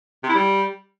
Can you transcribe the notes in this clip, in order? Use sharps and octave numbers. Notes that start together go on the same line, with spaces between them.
C3
E4
G3